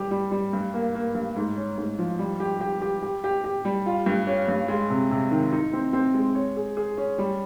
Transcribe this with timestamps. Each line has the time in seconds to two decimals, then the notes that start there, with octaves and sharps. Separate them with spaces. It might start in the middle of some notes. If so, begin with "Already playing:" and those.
Already playing: G3 G4
0.11 G3
0.31 G3
0.53 G2
0.74 A#3
0.95 A#3
1.15 G2
1.36 G#2
1.56 C#4
1.78 G#2
1.99 F3
2.19 G3
2.40 G4
2.61 G4
2.81 G4
3.02 G4
3.24 G4
3.44 G4
3.65 G3
3.86 F4
4.06 G2
4.27 C#4
4.48 G2
4.68 G#3
4.90 C3
5.11 C3
5.31 D#3
5.53 D#4
5.73 C4
5.93 C4
6.14 G#3
6.35 C#5
6.57 G#4
6.77 G#4
6.98 C#4
7.18 G3